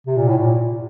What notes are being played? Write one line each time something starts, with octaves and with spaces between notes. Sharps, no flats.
C3
A#2
A2
A#2